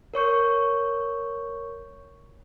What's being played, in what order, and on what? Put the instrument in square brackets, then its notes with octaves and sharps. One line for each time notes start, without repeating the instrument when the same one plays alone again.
[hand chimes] A#4 C#5 C#6 G6